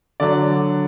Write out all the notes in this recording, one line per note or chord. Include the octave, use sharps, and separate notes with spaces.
D3 F#3 D5